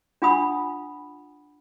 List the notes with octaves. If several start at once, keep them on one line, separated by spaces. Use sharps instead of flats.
D4 F4 F#5 G#5 B5 D#6